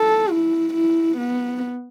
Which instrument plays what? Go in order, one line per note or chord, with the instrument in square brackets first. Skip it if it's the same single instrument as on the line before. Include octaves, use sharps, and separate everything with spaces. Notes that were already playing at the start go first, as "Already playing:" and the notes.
Already playing: [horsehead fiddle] A4
E4
E4
B3